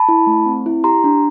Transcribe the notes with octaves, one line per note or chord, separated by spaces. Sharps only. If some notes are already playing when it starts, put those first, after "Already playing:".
Already playing: A5 B5
E4
A3
C4
E4
G4 A#5 C6
D4